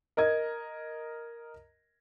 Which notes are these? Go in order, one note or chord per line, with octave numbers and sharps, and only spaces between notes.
A#4 D#5 G#6